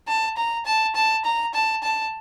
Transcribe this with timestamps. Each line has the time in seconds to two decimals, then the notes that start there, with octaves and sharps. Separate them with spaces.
0.08 A5
0.37 A#5
0.66 A5
0.95 A5
1.25 A#5
1.54 A5
1.83 A5